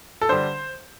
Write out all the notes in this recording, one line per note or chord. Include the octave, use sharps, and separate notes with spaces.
A4
D3 G3 D4 C5